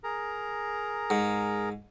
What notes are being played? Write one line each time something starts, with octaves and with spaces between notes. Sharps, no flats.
G#4 A#4 A#5
G#2